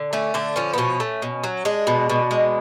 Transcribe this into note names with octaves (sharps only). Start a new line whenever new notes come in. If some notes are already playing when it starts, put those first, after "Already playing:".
Already playing: D3
A3 C#4
D3 D4
F3 C#4
B3
B2 C#4
A3
B2
F#3
G#3 D4
B2
B2
G#3